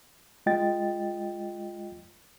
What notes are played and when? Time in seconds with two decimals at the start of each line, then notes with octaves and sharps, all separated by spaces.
0.46 G#3 F4 D#5 G5 A6